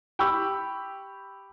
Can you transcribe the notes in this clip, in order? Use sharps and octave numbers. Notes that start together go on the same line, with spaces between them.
G4 G5 B5 C#6 E6